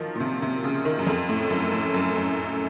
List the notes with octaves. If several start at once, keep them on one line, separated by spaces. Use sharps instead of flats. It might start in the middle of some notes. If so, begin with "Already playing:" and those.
Already playing: D#3 F3 F#3
A#2
C3
C3
C#3
D#3
F#2
F2
A2
F#2
A2
F#2
F#2